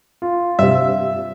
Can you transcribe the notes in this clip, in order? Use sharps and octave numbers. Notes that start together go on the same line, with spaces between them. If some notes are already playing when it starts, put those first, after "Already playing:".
F4
G2 C3 E5